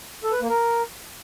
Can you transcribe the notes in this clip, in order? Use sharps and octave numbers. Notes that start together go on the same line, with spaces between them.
A4
B4
A#3
A#4